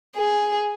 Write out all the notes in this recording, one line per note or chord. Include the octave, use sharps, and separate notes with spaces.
G#4